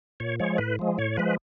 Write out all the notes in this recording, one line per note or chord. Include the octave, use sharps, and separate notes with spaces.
A#2 C#5
F3 G#3 C#5
A2 B4
F3 G#3
A2 C#5
F3 G#3 B4